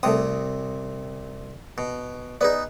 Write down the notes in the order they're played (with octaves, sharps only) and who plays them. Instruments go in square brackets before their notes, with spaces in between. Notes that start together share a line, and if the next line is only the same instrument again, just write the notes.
[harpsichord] C2 C3 D#6 [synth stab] A3 C4
[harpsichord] B2
[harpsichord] B3 D#4 [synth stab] G#4 B4 D5